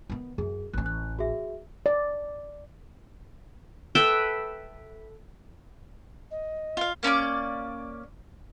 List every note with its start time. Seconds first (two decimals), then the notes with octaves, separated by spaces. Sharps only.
0.10 D#3 B3
0.38 F#2 G#4
0.74 A1 C#4 F#6
0.86 F#6
1.19 F#4 G#4 E5
1.86 D5
3.95 A4 B4 E5 G5
6.31 D#5
6.77 F4 F5
7.03 A#3 C#4 D5 D6